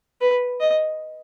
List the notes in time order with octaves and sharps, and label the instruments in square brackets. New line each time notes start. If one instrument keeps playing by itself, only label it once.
[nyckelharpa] B4
D#5